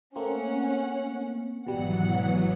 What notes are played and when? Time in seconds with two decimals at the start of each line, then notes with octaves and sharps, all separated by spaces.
0.16 A3 A#3 C4 C#4 F#5
1.67 G#1 B2 E3 F#3 G3 B3 F#5